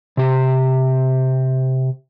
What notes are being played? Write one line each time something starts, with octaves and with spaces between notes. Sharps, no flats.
C3 G4